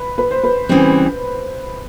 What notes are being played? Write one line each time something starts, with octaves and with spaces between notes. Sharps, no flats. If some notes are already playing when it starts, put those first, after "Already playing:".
Already playing: B4
B4
C5
B4
C#3 E3 G3 C4